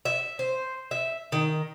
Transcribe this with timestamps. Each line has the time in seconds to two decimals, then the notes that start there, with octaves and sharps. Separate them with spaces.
0.05 E5
0.39 C5
0.91 E5
1.32 D#3